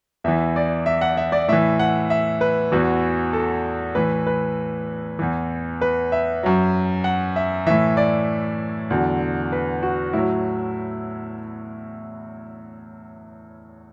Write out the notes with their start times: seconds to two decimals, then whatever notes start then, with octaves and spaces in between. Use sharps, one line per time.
0.24 E2 E3 E5
0.56 D5
0.86 E5
1.01 F#5
1.17 E5
1.32 D5
1.48 A2 E3 E5
1.79 F#5
2.10 E5
2.41 B4
2.72 E2 E3 F#4
3.33 A4
3.95 A2 E3 B4
4.27 B4
5.19 E2 E3
5.81 B4
6.12 E5
6.43 F#2 F#3
7.04 F#5
7.36 E5
7.66 A2 E3 E5
7.97 D5
8.90 E2 D3 F#3
9.52 B4
9.83 F#4
10.13 A2 F#3 E4